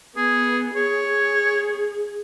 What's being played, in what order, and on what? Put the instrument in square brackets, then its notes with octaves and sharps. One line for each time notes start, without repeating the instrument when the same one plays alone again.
[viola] B3 [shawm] G#4
[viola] G#4 [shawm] C#5